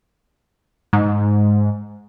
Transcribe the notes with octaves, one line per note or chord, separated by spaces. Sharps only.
G#2